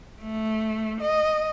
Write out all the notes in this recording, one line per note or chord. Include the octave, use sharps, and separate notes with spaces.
A3
D#5